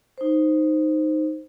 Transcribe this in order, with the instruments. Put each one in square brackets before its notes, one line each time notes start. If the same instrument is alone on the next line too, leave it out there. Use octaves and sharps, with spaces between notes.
[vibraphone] D#4 C5